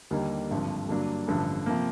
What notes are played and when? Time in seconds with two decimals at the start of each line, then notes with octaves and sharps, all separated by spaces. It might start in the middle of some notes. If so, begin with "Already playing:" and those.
0.11 D#2 D3 G3 A#3 D#4
0.51 G#1 G2 D3 F3
0.89 G2 D3 F#3 A#3 D4
1.28 A1 G2 D3 F3
1.66 C3 F3 A#3